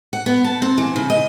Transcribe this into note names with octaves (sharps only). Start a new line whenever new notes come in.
F#5
B3
A5
C4
E3
C#3
D#5